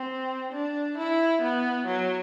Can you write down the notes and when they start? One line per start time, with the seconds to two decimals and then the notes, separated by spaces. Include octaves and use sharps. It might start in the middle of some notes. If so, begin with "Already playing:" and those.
Already playing: C4
0.53 D4
0.98 E4
1.42 B3
1.86 F#3